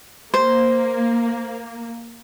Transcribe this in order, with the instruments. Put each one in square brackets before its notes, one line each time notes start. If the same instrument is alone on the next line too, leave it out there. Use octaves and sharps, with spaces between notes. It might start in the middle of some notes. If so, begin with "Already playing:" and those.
[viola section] A#3 [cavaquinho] C5